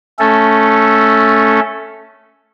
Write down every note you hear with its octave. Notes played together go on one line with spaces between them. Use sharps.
A3 C#4 A4